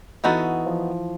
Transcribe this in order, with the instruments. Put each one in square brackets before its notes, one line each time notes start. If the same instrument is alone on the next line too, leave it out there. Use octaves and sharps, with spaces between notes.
[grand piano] E3 [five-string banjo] B3 D#4 F#4 A4
[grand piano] F3